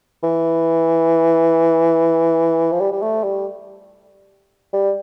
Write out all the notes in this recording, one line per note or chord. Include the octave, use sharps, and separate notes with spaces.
E3
F3
G3
G3
A3
G3
G3